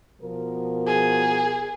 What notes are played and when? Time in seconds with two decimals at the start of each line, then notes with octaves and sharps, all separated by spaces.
0.22 B2 F3 A#4
0.87 G#4